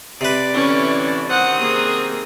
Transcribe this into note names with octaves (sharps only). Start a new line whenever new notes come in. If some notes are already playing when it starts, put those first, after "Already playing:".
C3 B4 D5
A2 D3 E3 C#4
D#3 G3 C4 F#5 D#6
A#3 G#4